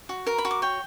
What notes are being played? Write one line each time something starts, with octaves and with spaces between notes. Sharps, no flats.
F#4
A#4 A#5
B5
F#4
D6
C#5 G5